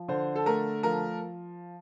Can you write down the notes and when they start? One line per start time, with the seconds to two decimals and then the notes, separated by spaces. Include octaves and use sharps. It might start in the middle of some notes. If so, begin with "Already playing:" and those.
Already playing: F3
0.08 D3 C5
0.36 A4
0.46 A3 A#4
0.83 F3 A#4